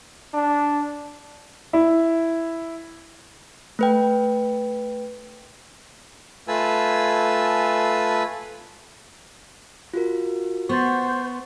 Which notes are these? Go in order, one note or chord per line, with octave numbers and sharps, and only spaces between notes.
D4
E4
A3 B4 G5
A3 F4 B4 G#5 A5 E6
F4 F#4 A#4
B3 C5 C#6 A6